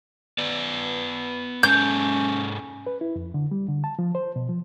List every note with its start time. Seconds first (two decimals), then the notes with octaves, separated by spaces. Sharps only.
0.38 B3 B4 D5
1.63 G#2 G#3 C#4 A4 G6
2.87 B4
3.01 E4
3.16 F2
3.34 D3
3.51 G3
3.68 D3
3.84 A5
3.99 F3
4.15 C5
4.36 B2
4.49 F3